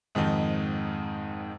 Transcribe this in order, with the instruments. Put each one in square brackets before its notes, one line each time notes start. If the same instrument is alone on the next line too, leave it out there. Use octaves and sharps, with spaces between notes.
[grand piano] F2 G#2 D#3 D#4